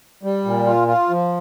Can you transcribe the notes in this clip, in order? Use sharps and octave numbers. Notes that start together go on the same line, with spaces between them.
G3
A#2
F4
F4
F3